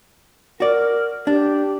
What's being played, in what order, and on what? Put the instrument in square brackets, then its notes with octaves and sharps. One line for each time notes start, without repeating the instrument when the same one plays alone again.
[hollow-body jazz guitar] F#4 D5 [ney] A#4
[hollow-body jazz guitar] D4 [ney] G4